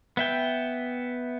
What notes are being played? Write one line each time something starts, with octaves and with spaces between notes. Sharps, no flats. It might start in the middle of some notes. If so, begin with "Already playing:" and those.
B3 E5 G5